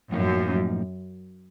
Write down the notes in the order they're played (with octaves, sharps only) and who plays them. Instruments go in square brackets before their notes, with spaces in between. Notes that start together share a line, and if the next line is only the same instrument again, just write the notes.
[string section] F#2 [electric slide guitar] A2 F3 A#3 D#4